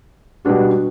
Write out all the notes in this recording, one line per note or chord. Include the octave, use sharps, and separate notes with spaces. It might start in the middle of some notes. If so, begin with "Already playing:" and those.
B2 G3 B3 D4 F#4